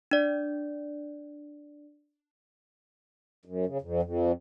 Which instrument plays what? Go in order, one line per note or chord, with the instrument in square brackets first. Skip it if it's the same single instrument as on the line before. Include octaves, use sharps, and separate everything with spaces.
[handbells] D4 D5
[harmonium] F#2
C#3
F2
F2